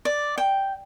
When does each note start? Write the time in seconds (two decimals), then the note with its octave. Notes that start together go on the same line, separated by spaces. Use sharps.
0.05 D5
0.38 G5